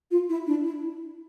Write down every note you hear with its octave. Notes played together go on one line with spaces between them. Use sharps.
F4
E4
D4
E4